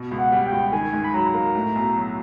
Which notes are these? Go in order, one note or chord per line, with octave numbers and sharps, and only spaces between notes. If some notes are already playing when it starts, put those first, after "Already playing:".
Already playing: B2
C#2
F#5
G3
G5
C#2
D#3 G#5
G#2
B5
F#3 A#5
A#3
A2
B1
F#3